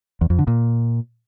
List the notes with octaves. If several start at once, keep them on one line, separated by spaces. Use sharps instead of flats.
E2
F2
D3
A#2